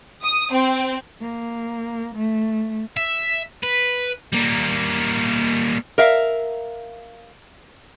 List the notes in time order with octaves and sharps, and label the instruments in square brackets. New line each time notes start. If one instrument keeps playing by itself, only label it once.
[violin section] D#6
C4
[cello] A#3
A3
[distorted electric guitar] E5
B4
G3 A#3
[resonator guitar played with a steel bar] A#4 E5 F5